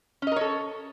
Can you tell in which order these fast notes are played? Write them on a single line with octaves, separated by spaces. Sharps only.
C#4 D#5 A#4 C#5 A4